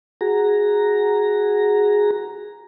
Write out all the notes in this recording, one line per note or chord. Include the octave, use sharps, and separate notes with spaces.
F#4 G#4 A#5